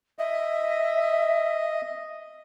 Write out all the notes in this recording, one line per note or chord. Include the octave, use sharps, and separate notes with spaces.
D#5 E5